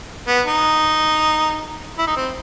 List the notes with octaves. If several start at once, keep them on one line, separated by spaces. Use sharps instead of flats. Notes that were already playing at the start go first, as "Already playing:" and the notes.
B3
D#4
E4
D#4
C4